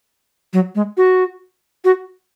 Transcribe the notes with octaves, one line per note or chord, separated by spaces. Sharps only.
F#3
G#3
F#4
F#4